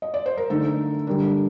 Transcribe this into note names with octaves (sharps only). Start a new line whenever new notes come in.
D#5
D5
C5
A#4
D3 A3 D#4 A4
D3 G3 D4 A#4